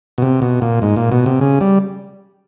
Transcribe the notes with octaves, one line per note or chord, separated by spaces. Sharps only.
B2
C3
B2
A#2
G#2
A#2
B2
C3
C#3
G3